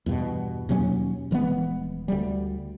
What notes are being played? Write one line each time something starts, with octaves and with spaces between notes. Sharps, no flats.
E2 G2 B2
D#2 B2 F#3 C#4
D#1 E3 G#3 B3
D2 G3